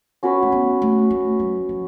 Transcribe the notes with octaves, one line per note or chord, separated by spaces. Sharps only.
C#4 F#4 B4
A3
B3
A3
A3
F#3
F3